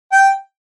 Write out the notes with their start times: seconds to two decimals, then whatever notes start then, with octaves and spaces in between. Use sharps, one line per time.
0.12 G5